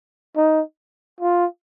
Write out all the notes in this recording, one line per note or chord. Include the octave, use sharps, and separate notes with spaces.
D#4
F4